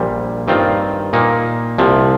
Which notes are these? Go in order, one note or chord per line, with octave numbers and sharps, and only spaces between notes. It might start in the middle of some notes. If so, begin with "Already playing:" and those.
Already playing: A#1 A#2 G3
G2 D#3 C4 F4
A#2 A#3 D#4
C2 C3 F3